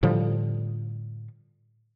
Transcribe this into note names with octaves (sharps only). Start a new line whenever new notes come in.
A2 D3 F3 G3